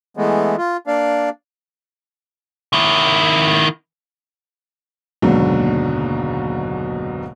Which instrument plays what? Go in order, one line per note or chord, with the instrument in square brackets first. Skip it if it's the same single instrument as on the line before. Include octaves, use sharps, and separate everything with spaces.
[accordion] E3 G#3 A3 B3
F4
A#3 D4 D5 F5
[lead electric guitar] D#3 E4
[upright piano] F#1 D#2 G#2 B2 D3 F#3